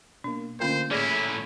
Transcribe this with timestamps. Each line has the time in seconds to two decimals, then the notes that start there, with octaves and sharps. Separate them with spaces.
0.24 B2 A#3 D4
0.60 D3 A3 A#3 C#4 F4 A#4 C5
0.91 A2 C#4 E4 G#4 C#5 D5 A#6